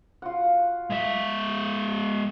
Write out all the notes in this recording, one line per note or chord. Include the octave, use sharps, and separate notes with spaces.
F4 F#4 F#5
G#3 E5